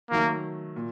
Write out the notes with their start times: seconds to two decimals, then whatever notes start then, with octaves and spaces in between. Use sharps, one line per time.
0.11 D#3 F#3 A3 A#3
0.76 A#2